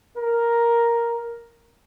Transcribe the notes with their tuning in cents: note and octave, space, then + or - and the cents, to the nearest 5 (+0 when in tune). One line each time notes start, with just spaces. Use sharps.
A#4 +5